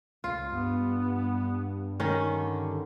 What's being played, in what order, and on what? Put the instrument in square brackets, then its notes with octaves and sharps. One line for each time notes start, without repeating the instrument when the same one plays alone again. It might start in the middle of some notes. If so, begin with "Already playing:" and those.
[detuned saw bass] C#2 [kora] F4
[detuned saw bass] G2 [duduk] B3
[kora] D#3 C#4
[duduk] D3